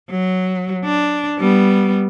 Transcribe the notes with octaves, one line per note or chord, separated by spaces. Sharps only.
F#3
D4
G3 B3